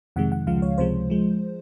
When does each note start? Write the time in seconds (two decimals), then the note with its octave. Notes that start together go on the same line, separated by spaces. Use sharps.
0.16 F2 C3 D#3 G#3 F#5
0.32 F#5
0.47 C#2 C#3 F3 G#3 F5
0.62 C#5
0.78 C#2 C3 F3 G#3 C5
1.10 F3 G#3